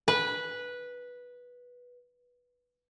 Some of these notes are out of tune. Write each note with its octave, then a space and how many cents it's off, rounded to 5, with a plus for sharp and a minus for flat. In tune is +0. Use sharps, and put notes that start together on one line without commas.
B4 -10